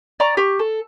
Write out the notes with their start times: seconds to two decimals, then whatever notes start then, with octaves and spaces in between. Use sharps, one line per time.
0.20 D5 A#5 C#6
0.37 G4 C#6
0.59 A4